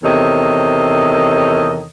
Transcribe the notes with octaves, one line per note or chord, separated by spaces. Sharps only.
E2 C3 D#3 A4 C#5 D#5